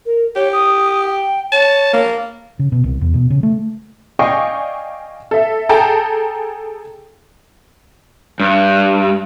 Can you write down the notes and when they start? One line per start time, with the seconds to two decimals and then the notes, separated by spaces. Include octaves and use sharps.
0.06 A#4
0.36 G4 C#5
0.52 D#6
1.06 G5
1.52 C#5 A5
1.93 A#3
2.59 C#3
2.72 B2
2.84 C2
3.01 E2
3.14 B2
3.30 C#3
3.43 A3
4.19 D5 D#5 F5 G5 G#5 C#6
5.31 A4 E5
5.69 G#4 A4 G5 A5 A#5
8.40 G2